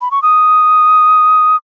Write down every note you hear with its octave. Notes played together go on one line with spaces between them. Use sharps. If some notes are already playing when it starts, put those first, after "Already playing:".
B5
C#6
D#6